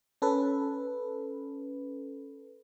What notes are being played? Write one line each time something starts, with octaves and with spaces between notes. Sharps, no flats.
C#4 A4 B4